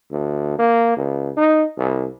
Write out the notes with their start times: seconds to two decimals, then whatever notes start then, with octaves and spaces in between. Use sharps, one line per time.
0.12 D2
0.59 A#3
0.97 C#2
1.37 D#4
1.78 C2